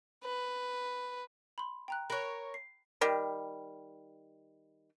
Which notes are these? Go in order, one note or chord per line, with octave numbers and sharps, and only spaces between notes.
B4
B5 C6
G5 A#5 F#6
A#4 C#5 B5 F#6
C7
D#3 G3